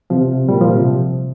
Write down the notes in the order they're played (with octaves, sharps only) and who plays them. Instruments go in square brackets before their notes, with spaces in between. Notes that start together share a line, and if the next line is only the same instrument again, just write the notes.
[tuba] C3 [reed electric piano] F3
[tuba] A#2 [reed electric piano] G3
[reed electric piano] F3
C3